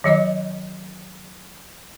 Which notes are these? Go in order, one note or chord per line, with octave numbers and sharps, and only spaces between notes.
D#3 F#3 D#5 D6